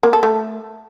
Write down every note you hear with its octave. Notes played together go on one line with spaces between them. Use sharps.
A#3
A4
A3